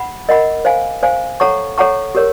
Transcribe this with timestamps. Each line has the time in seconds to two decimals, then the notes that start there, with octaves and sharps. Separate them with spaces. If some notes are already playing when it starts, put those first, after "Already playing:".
Already playing: F#5 B5
0.29 A#4 D#5 F#5 B5
0.65 C5 F5 G#5
1.03 C5 F5 G#5
1.40 A4 C#5 F#5 A#5 C#6
1.78 A4 C#5 F#5 A#5 C#6
2.15 G4 A#4 C#5